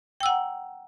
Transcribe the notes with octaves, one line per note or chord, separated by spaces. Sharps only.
F#5 G5 A#5 E6